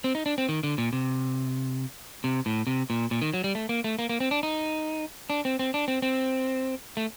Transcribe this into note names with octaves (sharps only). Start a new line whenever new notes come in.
C4
D#4
D4
C4
D#3
D3
A#2
C3
C3
A2
C3
A#2
A#2
D#3
F#3
G3
A3
A#3
A3
A#3
A#3
C4
D4
D#4
D4
C4
C4
D4
C4
C4
A3